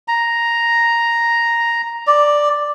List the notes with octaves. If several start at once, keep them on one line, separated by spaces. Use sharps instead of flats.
A#5
D5